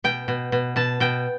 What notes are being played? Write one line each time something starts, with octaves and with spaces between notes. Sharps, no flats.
B2 G5
B2
B2
B2 A5
B2 G5